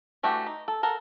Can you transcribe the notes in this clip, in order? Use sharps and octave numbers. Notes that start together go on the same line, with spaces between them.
E3 A3 D4 F#4 G4
D#4
A4
A4 A#4 F#5